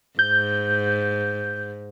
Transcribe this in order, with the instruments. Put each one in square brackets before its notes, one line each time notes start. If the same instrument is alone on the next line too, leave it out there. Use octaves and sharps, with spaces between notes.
[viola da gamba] G#2 [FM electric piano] G6